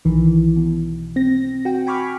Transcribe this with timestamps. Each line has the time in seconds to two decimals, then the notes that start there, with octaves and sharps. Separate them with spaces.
0.05 B1 D#3 E3
0.56 B2
1.16 C4 A#6
1.65 F#4 G5
1.87 G5 G#5 B5 C#6 D6 F6